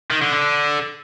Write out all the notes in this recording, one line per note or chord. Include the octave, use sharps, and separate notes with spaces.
D#3
D3
D3